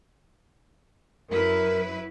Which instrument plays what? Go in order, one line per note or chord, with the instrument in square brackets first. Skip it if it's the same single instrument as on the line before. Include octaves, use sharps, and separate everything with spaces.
[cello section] F#2 E4 B4 [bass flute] A#4